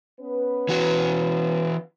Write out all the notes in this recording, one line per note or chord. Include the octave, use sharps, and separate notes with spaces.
B3 C#4 B4
E3 F#4